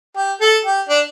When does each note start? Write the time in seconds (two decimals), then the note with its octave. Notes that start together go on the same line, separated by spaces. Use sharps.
0.16 G4
0.41 A4
0.65 G4
0.89 D4